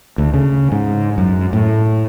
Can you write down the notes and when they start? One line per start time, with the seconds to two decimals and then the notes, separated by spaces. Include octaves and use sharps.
0.18 D2
0.34 C#3
0.72 G#2
1.18 F#2
1.53 A2